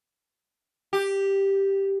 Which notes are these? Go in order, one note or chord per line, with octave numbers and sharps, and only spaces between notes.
G4